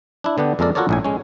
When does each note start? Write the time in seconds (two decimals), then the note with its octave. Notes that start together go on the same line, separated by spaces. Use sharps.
0.24 D4 E4
0.38 D3 B3 D4 G4
0.59 F2 G#3 A#3 A4 A#4 D5
0.75 F4 F#4 A4 A#4 C#5 D5
0.89 A#1 A2 G#5
1.04 G#3 C#4